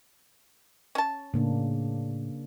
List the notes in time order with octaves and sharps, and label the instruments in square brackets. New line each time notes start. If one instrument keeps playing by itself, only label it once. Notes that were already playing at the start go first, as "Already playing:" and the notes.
[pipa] C#4 A5
[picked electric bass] A2 [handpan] C#3 A#3 D4